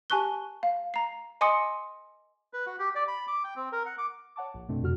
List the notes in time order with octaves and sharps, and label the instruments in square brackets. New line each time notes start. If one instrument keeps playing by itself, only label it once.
[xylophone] G4 G#5 A5 C#6 F#6 G7
F5
A#5 C7
D#5 G#5 C6 D6 D#6 C#7
[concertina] B4
F#4
G4
D5
B5
D6
G5
C4
A#4
F#5
D6
[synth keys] C#5 F#5 A5 D6
A#1
F#2 B2 A3 C4 D4
F2 C3 F#4 F6